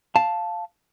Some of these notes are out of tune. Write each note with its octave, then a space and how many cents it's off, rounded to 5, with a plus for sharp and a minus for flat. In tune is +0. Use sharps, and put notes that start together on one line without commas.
F5 +0 A5 +0